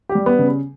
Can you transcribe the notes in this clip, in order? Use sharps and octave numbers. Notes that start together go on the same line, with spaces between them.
G4
G3
B3
C#3